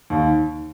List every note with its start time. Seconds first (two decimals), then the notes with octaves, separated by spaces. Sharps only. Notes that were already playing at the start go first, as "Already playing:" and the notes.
0.10 D#2